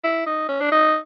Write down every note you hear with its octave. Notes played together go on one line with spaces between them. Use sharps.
E4
D#4
C#4
D4
D#4